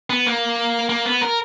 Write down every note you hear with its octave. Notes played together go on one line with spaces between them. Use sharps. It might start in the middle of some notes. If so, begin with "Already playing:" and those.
B3
A#3
A#3
B3
A#4